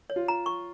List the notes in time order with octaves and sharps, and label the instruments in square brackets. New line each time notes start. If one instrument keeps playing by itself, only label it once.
[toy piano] C#5
[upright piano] F4
[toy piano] A#5
C#6